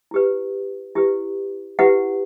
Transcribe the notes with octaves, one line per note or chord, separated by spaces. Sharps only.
E4 G4 B4
E4 G4 B4
E4 G4 B4 F#5